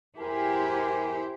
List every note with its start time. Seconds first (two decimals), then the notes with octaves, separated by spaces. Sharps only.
0.19 E2 E4 G4 A#4 C5 G#5